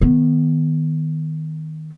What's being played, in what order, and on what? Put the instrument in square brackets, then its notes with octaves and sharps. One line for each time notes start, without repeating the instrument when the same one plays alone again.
[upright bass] D#3 B3